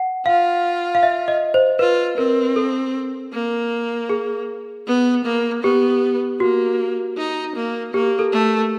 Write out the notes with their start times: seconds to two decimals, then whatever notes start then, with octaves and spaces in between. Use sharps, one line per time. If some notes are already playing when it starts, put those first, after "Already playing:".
Already playing: F#5
0.26 F4 F5
0.95 F5
1.03 E5
1.28 D#5
1.54 C5
1.79 F4 B4
2.18 C4 A#4
2.56 A4
3.33 A#3
4.09 G#4
4.87 B3
5.25 A#3
5.63 B3 G4
6.40 A#3 F#4
7.17 D#4
7.56 A#3
7.94 A#3 G4
8.19 A4
8.32 A3